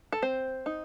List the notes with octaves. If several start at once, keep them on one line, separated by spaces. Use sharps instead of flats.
A4
C4 C5
D#4